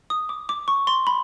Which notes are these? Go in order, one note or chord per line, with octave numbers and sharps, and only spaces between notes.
D#6
D6
D6
C#6
C6
B5